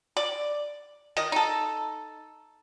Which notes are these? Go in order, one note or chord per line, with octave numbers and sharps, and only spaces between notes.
D5
D#3 D#5
D#4 A4